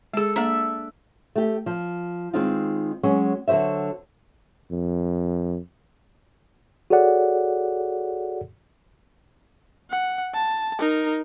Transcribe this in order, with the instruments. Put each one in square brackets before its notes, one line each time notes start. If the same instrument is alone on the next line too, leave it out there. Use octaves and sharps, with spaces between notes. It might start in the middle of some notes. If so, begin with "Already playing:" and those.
[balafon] G#3 G#4 [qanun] A4 A5
[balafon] A#3 A#5 [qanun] D4 E5
[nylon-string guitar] A3 G4
F3
D#3 G#3 C4 D#4 F4
F#3 G#3 C#4
D3 F#3 F#4 C5 E5
[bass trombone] F2
[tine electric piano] F#4 G#4 A4 C#5 D5 F#5
[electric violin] F#5
A5
D#4 A#4